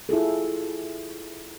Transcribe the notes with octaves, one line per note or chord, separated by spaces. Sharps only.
E4 F4 G#4 A4